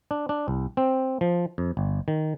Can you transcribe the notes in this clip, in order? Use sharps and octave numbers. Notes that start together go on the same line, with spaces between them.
D4
D4
C2
C4
F3
F2
G1
D#3